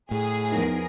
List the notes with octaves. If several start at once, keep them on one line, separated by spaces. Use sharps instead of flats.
A2 G#4
E2 F3 B3 D#4 A#4